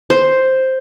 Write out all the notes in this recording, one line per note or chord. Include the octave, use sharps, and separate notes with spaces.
C5